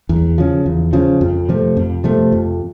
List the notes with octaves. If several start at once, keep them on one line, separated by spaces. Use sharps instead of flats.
E2
C#3 F3
E2
C#3 F3
F2
C3 F3 A3
F2
C3 F3 A3
F2